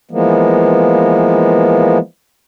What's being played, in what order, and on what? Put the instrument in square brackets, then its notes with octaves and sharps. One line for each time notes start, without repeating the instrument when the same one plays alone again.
[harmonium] E3 F3 G#3 A#3 B3